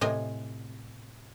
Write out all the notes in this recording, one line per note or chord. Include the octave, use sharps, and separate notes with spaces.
A2 C3 D#5 G#5